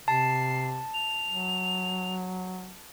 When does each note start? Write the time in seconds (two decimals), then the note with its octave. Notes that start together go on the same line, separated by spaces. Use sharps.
0.08 C3 A5 C7
0.94 F7
1.28 F#3